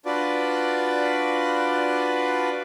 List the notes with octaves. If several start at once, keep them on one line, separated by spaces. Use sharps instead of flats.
D4 F4 F#4 B4 D5